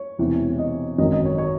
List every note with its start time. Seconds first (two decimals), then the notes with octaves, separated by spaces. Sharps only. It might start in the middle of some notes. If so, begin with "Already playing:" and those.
Already playing: C#5
0.18 E1 E2 C3 E3
0.59 D#5
0.98 G#1 F#2 D#3 D#5
1.12 D#5
1.26 C#5
1.38 C#5